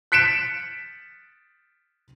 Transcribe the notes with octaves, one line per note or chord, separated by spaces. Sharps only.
F#6 B6 C#7 D7 E7